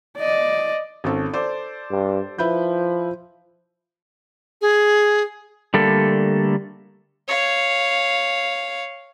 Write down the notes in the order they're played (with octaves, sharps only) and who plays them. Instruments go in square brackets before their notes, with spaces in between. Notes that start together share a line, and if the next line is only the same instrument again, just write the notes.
[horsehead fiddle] D5 D#5
[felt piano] G#1 C#4 A4
A4 C5 D5
[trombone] G2
[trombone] F3 [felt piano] E4 B4 G6
[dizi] G#4
[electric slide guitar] D3 G3 A3 A#3 A4
[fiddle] C#5 F5